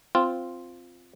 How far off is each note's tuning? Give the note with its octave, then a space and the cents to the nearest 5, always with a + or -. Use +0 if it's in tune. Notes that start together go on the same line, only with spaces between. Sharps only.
C4 +0 F4 +0